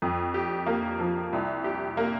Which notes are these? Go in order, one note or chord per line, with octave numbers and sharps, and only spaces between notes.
F2
G4
A#3
F3
C2
G4
A#3